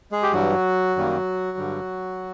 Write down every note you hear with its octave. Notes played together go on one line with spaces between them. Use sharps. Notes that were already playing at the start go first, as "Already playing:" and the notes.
G#3 G#4
G4
G2 E3 F#3 G3 F#4
F#2 D#3 G3 A#3
G2 D3 G3